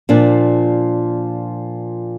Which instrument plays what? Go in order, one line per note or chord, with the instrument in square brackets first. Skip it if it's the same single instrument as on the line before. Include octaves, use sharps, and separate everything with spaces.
[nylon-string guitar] A#2 F3 A#3 D4